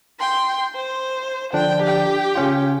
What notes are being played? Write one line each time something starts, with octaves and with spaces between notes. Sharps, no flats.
G5 C6
C5
D3 F3 D4 G5
G4 G5
C#3 C#4 F4